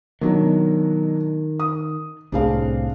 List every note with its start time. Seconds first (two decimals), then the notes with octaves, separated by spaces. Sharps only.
0.21 B2 D#3 F#3 D4
1.60 D#6
2.32 C2 A2 C4 D4 G#4 F5